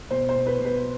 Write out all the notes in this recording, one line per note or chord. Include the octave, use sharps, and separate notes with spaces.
B2 C5
C5
B2
B4
B2
B4